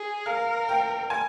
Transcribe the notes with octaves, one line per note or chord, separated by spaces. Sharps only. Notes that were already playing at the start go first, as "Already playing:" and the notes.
Already playing: G#4
A#4 F5
G5
G#5